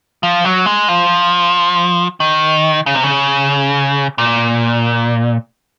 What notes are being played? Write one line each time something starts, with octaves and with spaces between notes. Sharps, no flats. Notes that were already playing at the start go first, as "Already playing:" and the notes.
F3
F#3
G#3
F3
D#3
C#3
C3
C#3
A#2